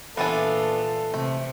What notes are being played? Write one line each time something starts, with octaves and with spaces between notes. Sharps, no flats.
A#2 E3 B3 D4 F4 A4 D5 G#5
C3 A3